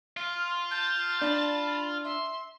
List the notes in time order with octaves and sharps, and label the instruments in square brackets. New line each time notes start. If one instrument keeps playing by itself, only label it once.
[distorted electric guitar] F4 [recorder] F6
[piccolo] A5 [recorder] G6
[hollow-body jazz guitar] D4 [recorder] B5
[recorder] E5 [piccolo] C6